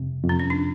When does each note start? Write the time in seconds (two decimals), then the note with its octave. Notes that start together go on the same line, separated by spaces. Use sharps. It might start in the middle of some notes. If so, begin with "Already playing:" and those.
Already playing: F2 C3
0.24 F2
0.29 C4
0.40 C#4
0.50 D4